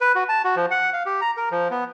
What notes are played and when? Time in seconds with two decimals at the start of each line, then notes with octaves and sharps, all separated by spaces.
0.01 B4
0.15 F#4
0.29 A5
0.44 F#4
0.56 F3
0.71 F#5
0.93 F5
1.06 G4
1.21 A#5
1.37 A#4
1.51 F3
1.71 B3